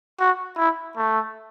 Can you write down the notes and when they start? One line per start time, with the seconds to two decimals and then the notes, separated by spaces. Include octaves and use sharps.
0.20 F#4
0.57 E4
0.97 A3